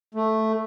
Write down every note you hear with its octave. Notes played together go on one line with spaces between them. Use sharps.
A3